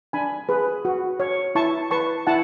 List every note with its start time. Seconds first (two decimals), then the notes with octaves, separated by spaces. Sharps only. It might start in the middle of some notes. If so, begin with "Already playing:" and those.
0.13 D4 G#5 B5
0.49 G#4 B4
0.85 F#4
1.20 C#5
1.55 E4 A5 C#6
1.91 B4 A5 C#6
2.27 E4 F#5 A5